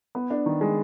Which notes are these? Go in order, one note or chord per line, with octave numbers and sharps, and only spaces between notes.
B3
D4
D#3
G#3